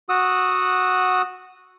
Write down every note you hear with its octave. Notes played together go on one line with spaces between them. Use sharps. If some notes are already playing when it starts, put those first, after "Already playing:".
F#4 F#5 D#6 E6